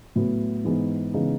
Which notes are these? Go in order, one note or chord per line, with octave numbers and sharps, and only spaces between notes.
A2 F#3 B3
G#2 E3 B3 D#4 G#4
C#3 E3 G#3 B3 D#4